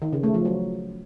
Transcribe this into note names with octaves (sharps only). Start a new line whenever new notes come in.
D#3
C#3
A3
F3
F#3